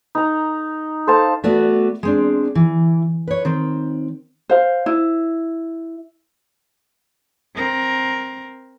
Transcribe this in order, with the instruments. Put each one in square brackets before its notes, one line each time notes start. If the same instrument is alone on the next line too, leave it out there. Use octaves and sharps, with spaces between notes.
[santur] D#4 A#5
A4 C5 F5 A5
[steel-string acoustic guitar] A3 B3 F#4 D5
G#3 C4 D4
E3
B4 C#5
D#3 C4
[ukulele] C5 F5
E4
[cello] C4 A#4